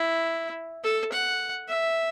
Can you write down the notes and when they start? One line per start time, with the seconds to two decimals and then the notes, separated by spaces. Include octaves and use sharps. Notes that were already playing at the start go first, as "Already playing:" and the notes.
Already playing: E4
0.84 A4
1.12 F#5
1.68 E5